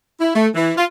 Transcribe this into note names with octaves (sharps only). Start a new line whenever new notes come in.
E4
A3
E3
F4